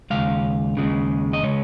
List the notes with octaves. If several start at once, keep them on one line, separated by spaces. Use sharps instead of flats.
D#2 C#3 G#3 F5
D#2 C#3 G#3
D#5
C#3 G#3 C#5